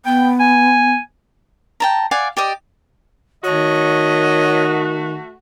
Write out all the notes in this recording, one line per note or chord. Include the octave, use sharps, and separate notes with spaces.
B3 G5
G#5
G5 A5 A#5
D5 F5 F#5 G#5
G4 D5 D#5
D#3 A3 F#4 C#5 D#5